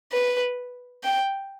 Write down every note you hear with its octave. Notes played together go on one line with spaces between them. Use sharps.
B4
G5